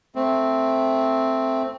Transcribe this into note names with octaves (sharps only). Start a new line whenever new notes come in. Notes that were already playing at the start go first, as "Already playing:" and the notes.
A3 C4